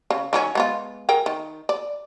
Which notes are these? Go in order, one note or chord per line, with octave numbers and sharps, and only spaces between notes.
C#3
D#3 F#3 C#4
G#3 B3 F4
G#4 A#4 G5
D#3
D5